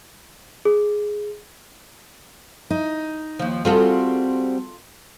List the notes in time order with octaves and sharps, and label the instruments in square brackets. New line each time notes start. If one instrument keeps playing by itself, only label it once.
[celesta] G#4
[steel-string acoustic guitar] D#4
[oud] D#2 F3
[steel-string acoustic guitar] G3 C4 F#4 [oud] F4 G#4 A4